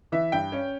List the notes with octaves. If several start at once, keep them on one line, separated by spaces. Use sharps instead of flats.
E3 E5
G2 G5
C#4